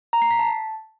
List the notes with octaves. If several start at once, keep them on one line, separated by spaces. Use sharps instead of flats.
A#5
C7
B6
A5